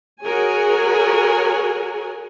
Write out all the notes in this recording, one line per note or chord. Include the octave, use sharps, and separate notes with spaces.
F#4 G#4 A#4 C#5 G#5